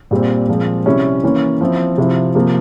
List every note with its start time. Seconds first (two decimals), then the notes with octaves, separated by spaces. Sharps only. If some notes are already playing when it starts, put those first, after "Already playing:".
0.11 A#2 G3 C4
0.49 A#2 F3 G#3 C4
0.86 C3 G3 C#4 E4
1.23 E3 A#3 C#4
1.61 F3 C4 E4
1.98 C3 F3 C4 E4
2.35 C3 F3 A#3